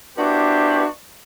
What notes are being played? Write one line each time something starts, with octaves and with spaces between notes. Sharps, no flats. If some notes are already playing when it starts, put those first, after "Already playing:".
B3 D4 E4 F#4 G4 C5